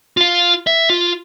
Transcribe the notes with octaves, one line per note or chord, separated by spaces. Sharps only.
F4 F5
E5
F4